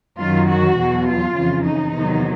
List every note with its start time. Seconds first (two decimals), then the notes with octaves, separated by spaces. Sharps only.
0.18 F#2 D#3 F#3 F4
0.48 F#4
0.77 E2 B2 F#3
1.05 F4
1.35 F2 C#3 E3
1.64 D#4
1.93 E2 C3 D#3 F#3